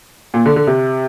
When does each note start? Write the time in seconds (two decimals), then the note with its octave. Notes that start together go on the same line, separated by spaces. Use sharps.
0.34 A#2
0.46 D3
0.56 D3
0.67 C3